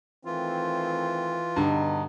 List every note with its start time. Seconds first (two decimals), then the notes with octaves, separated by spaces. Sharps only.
0.25 D#3 E3 A3 C4 F4
1.56 G2 B2 D3 D#4